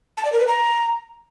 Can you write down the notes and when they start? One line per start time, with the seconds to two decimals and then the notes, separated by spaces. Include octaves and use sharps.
0.17 A5
0.25 D5
0.32 A#4
0.40 B4
0.47 A#5